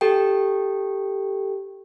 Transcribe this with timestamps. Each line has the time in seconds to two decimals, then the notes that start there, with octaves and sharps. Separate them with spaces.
0.01 G4 A4 G5